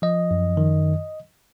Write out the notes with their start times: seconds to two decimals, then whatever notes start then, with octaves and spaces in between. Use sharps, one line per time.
0.02 F3 D#5
0.31 F#2
0.57 D#3